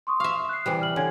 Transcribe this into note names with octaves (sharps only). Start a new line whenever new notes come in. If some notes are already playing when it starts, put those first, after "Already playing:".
C6 C#6 D#6
E5 F5
F#6 C7
C3 E3 G3
F6 F#7
D3 C#5 G#5 G#6